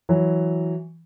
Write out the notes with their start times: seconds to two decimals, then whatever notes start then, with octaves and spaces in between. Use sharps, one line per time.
0.09 E3 F#3